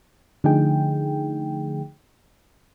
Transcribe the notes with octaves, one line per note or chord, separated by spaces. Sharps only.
D3 F3 A3 D#4 G#4 G5